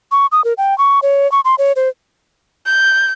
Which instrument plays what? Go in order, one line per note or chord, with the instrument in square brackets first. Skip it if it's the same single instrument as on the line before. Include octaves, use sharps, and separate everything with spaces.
[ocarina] C#6
D#6
A#4
G5
C#6
C#5
C#6
C6
C#5
C5
[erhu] G6